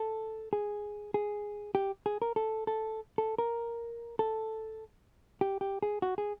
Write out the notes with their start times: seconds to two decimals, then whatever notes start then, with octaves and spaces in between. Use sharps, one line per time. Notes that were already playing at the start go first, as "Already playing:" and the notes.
Already playing: A4
0.53 G#4
1.14 G#4
1.75 G4
2.06 G#4
2.22 A#4
2.36 A4
2.67 A4
3.18 A4
3.38 A#4
4.19 A4
5.41 G4
5.61 G4
5.83 G#4
6.02 F#4
6.18 G#4